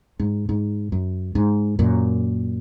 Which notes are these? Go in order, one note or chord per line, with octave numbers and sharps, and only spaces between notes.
G#2
G#2
F#2
G#2
F#2 A#2